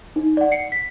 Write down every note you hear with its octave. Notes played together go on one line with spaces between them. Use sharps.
D#4
D5 F#5
C7 C#7
B6